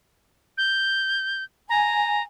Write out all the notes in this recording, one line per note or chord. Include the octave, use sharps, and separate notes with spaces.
G6
G#5 A#5